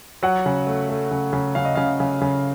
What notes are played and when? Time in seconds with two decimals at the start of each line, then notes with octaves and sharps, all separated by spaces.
0.23 F#3 F#5
0.46 C#3
0.67 A3
0.89 A3
1.11 C#3
1.33 C#3
1.55 C#3 F5
1.65 D#5
1.75 C#3 F5
2.00 C#3
2.21 C#3